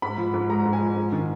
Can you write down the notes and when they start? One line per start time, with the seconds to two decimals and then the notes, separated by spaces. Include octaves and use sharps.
0.02 G#2 B5
0.18 F3
0.34 G#2
0.49 G#3 A#5
0.65 G#2
0.73 G#5
0.81 F3
0.96 G#2
1.12 D#3